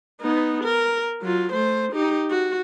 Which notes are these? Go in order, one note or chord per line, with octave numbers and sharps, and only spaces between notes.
B3 D#4
A#4
F#3 F4
A3 C5
D#4 G4
F#4